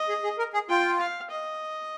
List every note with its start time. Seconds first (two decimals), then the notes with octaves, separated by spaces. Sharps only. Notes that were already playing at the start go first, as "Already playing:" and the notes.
Already playing: D#5
0.09 G#4
0.24 G#4
0.38 A#4
0.54 G#4
0.69 F4 G5
1.00 F5
1.31 D#5